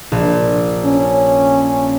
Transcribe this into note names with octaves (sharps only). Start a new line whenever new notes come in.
A#1
C#4